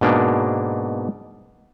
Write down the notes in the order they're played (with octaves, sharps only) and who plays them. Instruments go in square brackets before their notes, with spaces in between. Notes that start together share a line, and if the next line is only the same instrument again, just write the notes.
[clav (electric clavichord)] G#2 B2 A#3 D4